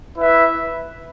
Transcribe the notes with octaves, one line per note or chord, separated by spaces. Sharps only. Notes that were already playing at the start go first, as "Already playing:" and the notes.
E4 B4 E5